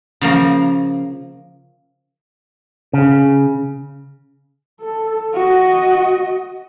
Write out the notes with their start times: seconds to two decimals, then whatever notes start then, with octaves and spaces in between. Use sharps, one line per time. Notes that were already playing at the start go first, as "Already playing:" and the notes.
0.21 C#3 F3 A#3
2.93 C#3
4.81 A4
5.34 F#4 D#5